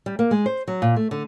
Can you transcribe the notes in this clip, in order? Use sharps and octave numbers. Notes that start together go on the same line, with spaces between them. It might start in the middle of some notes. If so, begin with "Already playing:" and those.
G3
A#3
G#3
C5
F#3
A#2
A3
D3